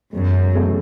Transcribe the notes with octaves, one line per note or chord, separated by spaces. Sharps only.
E1 F#2
E2 C#3 A3 C#4